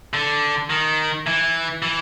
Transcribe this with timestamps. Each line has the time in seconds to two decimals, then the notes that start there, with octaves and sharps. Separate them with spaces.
0.14 D3
0.70 D#3
1.27 E3
1.82 E3